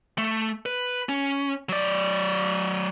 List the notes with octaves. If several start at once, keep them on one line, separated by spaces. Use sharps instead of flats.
A3
B4
C#4
F#3 D5